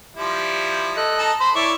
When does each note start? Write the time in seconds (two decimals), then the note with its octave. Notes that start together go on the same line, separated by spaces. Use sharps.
0.17 F3 G3 E4
0.97 A4 D#5 F#6
1.19 D#4 A5
1.40 C5 B5
1.55 E4 C#5 D5 E5